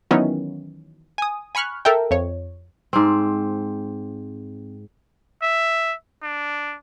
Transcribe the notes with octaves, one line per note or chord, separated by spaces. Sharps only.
D#3 E3 F#3 B3 C#4
G#5 D#6
G#5 B5 C#6 F6 F#6
A4 A#4 E5 G5
F2 C#5
G#2 C4
E5
D4